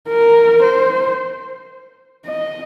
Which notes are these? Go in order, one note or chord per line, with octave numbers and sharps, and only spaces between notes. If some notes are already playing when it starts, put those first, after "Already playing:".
A#4
C5
D#5